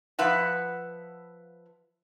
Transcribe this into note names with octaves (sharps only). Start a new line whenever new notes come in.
F3 B4 E5 F#5